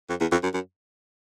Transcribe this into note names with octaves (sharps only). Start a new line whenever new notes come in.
F2
E2
F2
F#2
F#2